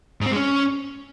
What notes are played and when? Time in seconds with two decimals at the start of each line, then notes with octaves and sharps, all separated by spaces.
0.21 G#2
0.26 C4
0.31 G#3
0.36 C#4